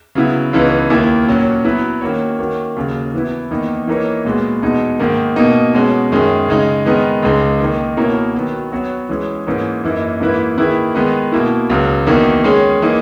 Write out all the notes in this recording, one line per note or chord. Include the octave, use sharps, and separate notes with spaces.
C#3 F#3 B3 E4
C#2 C#3 E3 B3 D#4
D#2 D#3 A#3 E4
A#2 F#3 C#4 F#4
F#3 B3 E4 B4
D#3 A#3 C#4 F#4 C#5
D#3 A#3 C#4 F#4
D#2 C#3 F#3
E3 B3 E4
E2 D#3 A#3 D#4
E3 A#3 D#4 A#4 C#5
A#2 G#3 B3 F#4
E2 B2 G#3 D#4
G#2 D#3 A#3
B2 A#3 D#4
B2 G#3 C#4 F#4
F#2 D#3 G#3 C#4 G#4
C#3 G#3 D#4
D#3 G#3 B3 D#4 A#4
C#2 C#3 G#3 D#4
D#3 A#3 D#4
B2 A#3 E4 A#4 C#5
D#3 F#3 B3 F#4
F#3 B3 F#4 C#5
E3 G#3 C#4 G#4
G#2 E3 A#3 C#4
F#2 E3 A#3 D#4
G#2 E3 A#3 E4 B4
D#3 A#3 E4 G#4 B4
D#3 G#3 B3 D#4
B2 A#3 E4
C#2 C#3 F#3
E2 D#3 A#3 D#4 F#4
D#3 G#3 C#4 G#4 C#5
E3 A#3 D#4 G#4